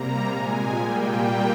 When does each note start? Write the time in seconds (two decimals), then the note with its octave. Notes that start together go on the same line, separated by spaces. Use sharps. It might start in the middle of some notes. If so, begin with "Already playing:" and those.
Already playing: C3 G3 A#3 A#5
0.25 A#2 G#3 G#5
0.78 A#2 G3 A#3 G5